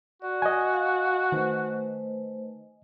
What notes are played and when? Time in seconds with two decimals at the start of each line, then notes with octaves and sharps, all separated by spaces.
0.22 F#4 D5
0.42 D#5 G#5
0.73 F5
1.32 D#3 A3 B4 C5